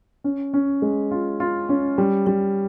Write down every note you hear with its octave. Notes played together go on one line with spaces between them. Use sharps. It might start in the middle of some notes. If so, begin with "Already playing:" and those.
C#4
C#4
G#3
F4
F4
C#4
G3
G3